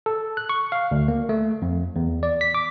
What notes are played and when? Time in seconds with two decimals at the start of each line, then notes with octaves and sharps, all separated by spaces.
0.06 A4
0.37 F#6
0.49 C#6
0.72 F5
0.91 D2
1.08 A#3
1.29 A3
1.62 F2
1.96 E2
2.23 D5
2.41 B6
2.54 D6